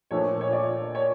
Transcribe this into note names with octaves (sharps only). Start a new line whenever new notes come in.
A#2 F3 A3 D4 C#5
C#5
D5
C#5